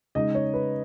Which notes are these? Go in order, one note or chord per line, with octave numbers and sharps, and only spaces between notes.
C#3 G#3 D#4 D#5
C#5
B4